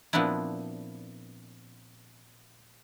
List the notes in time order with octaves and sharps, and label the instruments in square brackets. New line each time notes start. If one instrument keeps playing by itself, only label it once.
[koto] A#2 F3 B3 C4 D4 E4